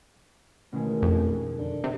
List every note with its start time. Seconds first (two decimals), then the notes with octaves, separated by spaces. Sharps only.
0.72 A1 B2 D#3 G#3
1.02 F2
1.58 D3
1.84 C3